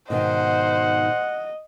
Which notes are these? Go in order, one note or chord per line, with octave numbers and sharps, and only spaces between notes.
G#2 B2 D#3 C5 D#5 F#5